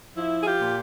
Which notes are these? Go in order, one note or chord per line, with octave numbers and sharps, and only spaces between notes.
F3 E4
G#4
F4 G4
A#2